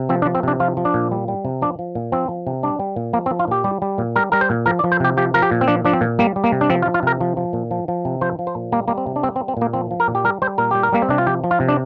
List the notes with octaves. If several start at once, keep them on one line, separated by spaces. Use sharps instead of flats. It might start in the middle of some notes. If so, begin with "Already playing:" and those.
Already playing: C3
F3 C4
D4
F3
C4
C3 D4
F3 F4
F3
D4
A#2
G3
G3
C3
F3 D4
F3
A#2
F3 C4
F3
C3
G3 D4
G3
A#2
F3 A#3
C4
F3
F4
A#2 G4
G3
G3
A#2
G3 A#4
G3 A#4
C5
A#2
F3 A#4
D5
F3
C5
C3 G4
F3 G4
F3 A#4
G4
A#2
C4
F3 D4
F3 D4
C4
A#2
G3 A#3
G3
A#3
C3
D4
F3 C4
F4
F3
F4
C3 A#4
F3
F3
A#2
F3
F3
C3
F3 C5
F3
C5
A#2
G3 A#3
G3 A#3
C4
C3
D4
G3 C4
C4
G3
C4
A#2 A#3
F3 C4
F3
A#4
A#2
G4
G3 A#4
G3 C5
A#2 A#4
G3 G4
A#4
G3 A#3
C4
C3 D4
F4
F3 G4
F3
F4
C3
D4